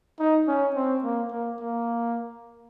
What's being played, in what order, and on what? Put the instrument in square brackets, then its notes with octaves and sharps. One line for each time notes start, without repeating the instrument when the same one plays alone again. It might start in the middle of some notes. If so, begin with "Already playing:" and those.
[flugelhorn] D#4
C#4
C4
A#3
A#3
A#3